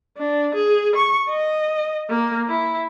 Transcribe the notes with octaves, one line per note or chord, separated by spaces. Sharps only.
D4
G#4
C#6
D#5
A#3
E4